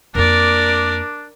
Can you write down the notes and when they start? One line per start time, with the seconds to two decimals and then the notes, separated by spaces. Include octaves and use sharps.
0.15 F2 A#3 D4 A#4 D5